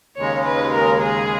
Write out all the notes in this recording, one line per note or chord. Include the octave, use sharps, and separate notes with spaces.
D#2 C#3 G#3 C#5
B4
A#4
G#4